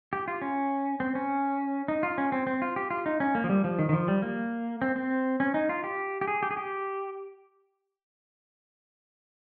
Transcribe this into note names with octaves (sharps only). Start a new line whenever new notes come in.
G4
F4
C#4
C4
C#4
D#4
F4
C#4
C4
C4
F4
G4
F4
D#4
C#4
A#3
F3
G3
F3
D#3
D#3
F3
G3
A#3
C4
C4
C#4
D#4
F4
G4
G4
G#4
G4
G#4
G4